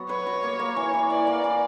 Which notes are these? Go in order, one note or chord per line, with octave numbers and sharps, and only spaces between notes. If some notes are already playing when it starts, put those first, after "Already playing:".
Already playing: F#3 B3 F#4
B4 C#5
F#4
A#3
A#3
E3
E3
E3 D5
A#3
E3